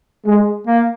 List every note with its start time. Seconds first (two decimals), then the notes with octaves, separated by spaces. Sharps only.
0.26 G#3
0.67 A#3